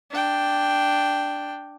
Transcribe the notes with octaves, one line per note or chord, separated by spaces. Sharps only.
D4 G5